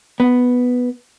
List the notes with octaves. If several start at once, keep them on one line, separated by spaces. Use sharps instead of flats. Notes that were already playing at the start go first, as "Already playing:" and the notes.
B3